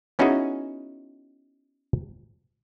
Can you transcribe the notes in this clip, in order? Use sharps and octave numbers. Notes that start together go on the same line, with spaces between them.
B3 C#4 D#4 E4 F#4 G#4